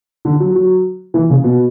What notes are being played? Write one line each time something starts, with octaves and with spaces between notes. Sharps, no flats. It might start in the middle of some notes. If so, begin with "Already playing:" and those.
D3
F#3
F#3
E3
C#3
B2